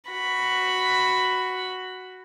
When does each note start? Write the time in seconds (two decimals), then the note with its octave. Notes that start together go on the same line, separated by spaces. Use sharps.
0.10 F#4 B5